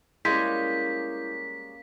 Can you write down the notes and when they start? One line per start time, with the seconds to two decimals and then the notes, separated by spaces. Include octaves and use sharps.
0.25 G3 G#3 A#3 C#4 E4 G6 B6